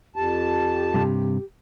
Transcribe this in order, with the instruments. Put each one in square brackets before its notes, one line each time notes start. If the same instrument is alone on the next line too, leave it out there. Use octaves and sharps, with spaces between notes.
[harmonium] F2 A5 [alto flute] G4
[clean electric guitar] G2 C3